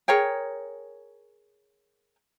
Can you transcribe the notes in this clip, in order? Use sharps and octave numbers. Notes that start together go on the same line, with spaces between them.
G#4 A#4 C#5 G5